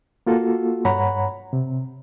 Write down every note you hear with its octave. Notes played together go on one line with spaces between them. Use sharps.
A#3 F4 F#4 A4
G2 C#5 F#5 A#5 B5
C3